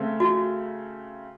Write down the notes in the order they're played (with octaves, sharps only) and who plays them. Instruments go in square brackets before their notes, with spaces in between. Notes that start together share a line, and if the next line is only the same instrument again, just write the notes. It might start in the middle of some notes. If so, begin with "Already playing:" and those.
Already playing: [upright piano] C#3 A3 C4
[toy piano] F#4